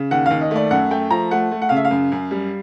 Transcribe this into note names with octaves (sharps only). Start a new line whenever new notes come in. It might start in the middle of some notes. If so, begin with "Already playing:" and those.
Already playing: C#3
D#2 F#5
D#2 F5
D#5
A3 D5
F#2 F#5
A3 G5
F3 A#5
A3 F#5
A3
F#5
C#3 F5
E5
F5
F#2
F#2
G3